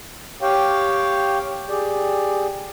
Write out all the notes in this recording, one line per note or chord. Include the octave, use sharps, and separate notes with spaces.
G4 C#5 F5 G5
G4 G#4 D5